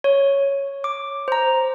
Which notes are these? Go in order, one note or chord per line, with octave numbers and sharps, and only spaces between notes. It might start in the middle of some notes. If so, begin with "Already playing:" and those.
C#5
D6
C5 A#5